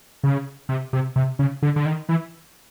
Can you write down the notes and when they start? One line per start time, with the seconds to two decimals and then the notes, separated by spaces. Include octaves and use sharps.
0.23 C#3
0.69 C3
0.93 C3
1.16 C3
1.39 C#3
1.62 D3
1.76 D3
1.86 D#3
2.09 E3